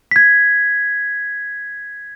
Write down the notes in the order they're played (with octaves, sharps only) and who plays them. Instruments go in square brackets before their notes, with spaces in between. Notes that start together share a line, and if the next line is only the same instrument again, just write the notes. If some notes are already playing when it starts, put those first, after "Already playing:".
[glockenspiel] G#6 B6